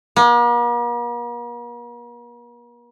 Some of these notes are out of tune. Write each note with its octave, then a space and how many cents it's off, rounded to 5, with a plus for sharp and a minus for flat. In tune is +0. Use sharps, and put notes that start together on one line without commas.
A#3 +45